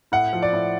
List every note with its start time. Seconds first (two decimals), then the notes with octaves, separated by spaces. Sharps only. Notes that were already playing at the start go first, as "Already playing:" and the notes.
0.12 A2 F#5
0.33 F3
0.42 D5
0.53 A2